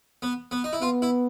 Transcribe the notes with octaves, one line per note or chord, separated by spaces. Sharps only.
B3
B3
D#4
E4
B3 F4
E4